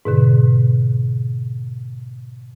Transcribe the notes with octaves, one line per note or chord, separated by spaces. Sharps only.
G#2 B2 D3